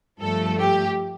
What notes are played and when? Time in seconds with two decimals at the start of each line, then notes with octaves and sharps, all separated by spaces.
0.20 G2 F3 A3 A4
0.58 G4